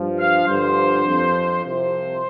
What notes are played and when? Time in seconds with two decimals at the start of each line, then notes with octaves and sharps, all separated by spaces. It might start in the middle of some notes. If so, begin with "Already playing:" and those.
Already playing: G2 F3
0.18 F5
0.48 G2 D3 F3 C5
1.06 F2 F3
1.64 C2 C3 F3 C5